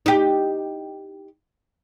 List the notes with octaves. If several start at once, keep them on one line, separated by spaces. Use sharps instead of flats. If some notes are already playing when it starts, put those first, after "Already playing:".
D#4 G4